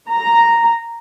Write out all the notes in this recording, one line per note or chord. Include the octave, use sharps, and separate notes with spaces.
A#5